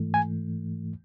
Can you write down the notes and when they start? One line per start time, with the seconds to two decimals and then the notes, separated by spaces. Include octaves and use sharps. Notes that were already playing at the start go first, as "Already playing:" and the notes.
Already playing: G#2 E3 A3
0.14 G#5